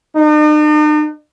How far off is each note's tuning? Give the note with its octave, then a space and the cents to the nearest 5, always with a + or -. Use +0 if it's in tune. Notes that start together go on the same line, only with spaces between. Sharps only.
D#4 -45